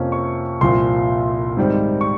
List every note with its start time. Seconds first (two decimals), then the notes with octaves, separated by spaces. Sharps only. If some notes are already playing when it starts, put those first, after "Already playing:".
Already playing: F2 C3 F3 A#3 C#4
0.12 C#6
0.61 C2 A#2 F3 C6
1.57 G#2 D#3 G3 C4
2.01 C#6